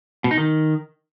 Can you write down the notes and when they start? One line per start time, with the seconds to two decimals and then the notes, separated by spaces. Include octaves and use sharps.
0.24 B2
0.31 D#4
0.38 D#3